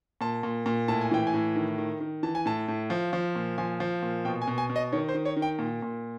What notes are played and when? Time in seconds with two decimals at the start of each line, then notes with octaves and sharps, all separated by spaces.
0.21 A#2 A5
0.43 A#2
0.66 A#2
0.88 A2 A5
1.01 G#5
1.11 E3 G5
1.27 G#5
1.34 A2
1.56 D#3
1.78 D#3
2.00 D#3
2.23 E3 A5
2.35 G#5
2.46 A2 A5
2.68 A2
2.90 F3
3.13 F3
3.35 A#2
3.58 F3 G#5
3.80 F3
4.02 A#2
4.25 B2 G5
4.42 G#5
4.47 B2
4.58 G#5
4.70 B2
4.76 D#5
4.92 D#3 C#5
5.09 C5
5.14 D#3
5.25 C#5
5.37 D#3
5.42 G5
5.59 A#2
5.82 A#2